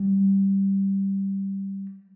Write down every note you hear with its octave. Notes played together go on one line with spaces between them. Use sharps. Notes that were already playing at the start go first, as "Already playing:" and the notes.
Already playing: G3